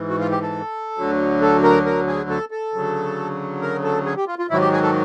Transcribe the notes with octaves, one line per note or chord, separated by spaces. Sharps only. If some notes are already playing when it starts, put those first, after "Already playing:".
Already playing: G#2 E3
F#4
F4
G4
A4
D2 D3 F#3
A4
A#4
A#4
G#4
A4
A4
D2 C#3 F#3
A#4
A4
G#4
G4
F4
F4
G#2 D#3 F#3 E4
G4
G#4
A4